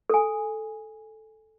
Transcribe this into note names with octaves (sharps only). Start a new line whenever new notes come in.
A4 G#5